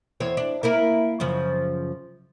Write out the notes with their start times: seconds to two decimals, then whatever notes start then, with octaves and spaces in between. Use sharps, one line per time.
0.20 E2 C4 C#5
0.37 D4
0.63 A#3 E4 A#4
1.20 F#2 C#3 F3